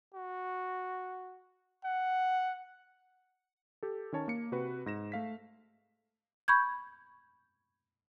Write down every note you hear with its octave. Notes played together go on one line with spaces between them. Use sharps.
F#4
F#5
G4 A4
D#3 C#4 C#5 A5
A#3 C#7
C3 F#4 B4
G#2 A#6 E7
A3 F5 B6
B5 C#6 G6 G#6